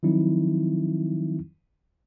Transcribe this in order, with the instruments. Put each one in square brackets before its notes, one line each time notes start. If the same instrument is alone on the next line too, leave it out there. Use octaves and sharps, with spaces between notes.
[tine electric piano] D#3 F3 F#3 C4 D#4 E4